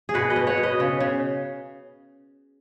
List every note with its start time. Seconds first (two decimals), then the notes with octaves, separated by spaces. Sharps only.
0.09 G#4
0.14 B2 F#4 B4
0.30 B4 D#5
0.36 B2
0.47 C#5 F#5
0.57 B2
0.63 B4 D#5
0.80 C#3
1.00 C#3